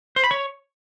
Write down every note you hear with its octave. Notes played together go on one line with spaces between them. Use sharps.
C5
B5
C#5